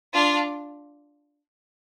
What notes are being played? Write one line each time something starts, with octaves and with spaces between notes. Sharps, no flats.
D4 F4